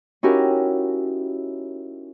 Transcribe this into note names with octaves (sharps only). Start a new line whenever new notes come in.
C#4 D#4 E4 F#4 G4 A#4